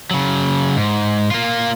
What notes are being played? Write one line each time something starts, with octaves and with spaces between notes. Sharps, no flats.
C#3 F#3
G#2
A#3 F4